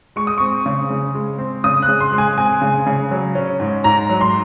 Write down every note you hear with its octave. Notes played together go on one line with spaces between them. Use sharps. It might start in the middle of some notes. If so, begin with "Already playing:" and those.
G#3 C#6
D#6
C4 C#6
C#3
C#3
G#3
C4
C#3 D#6
F#6
C#3
C6
G#3
G#5
C4 G#5
C#3
C#3
F#3
C#4
G#2
G#2 A#5
F#3
C6